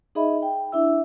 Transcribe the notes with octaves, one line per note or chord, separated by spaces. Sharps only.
D#4 G#4 D#5 E5 B5
G5
D4 E4 E5 E6